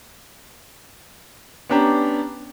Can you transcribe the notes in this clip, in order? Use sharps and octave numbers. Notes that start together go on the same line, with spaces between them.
B3 C#4 D4 G4 A#5